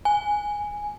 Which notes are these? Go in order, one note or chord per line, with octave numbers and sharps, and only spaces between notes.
G#5